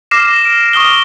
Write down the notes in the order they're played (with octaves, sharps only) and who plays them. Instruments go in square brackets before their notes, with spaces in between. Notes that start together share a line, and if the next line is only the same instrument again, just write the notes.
[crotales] D6 F6 A#6 C7 E7
D7
C#6 D#6 F6 G7